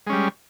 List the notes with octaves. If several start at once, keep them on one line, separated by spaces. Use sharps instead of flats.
G3 G#3 C#4